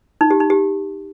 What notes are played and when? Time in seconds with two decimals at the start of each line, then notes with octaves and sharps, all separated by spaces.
0.21 D#4
0.31 G4
0.40 D#4
0.50 G4